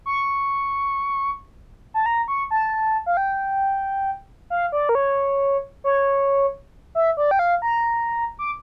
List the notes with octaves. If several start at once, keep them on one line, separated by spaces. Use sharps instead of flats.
C#6
A5
A#5
C#6
A5
F5
G5
F5
D5
A#4
C#5
C#5
E5
D5
G5
F5
A#5
D6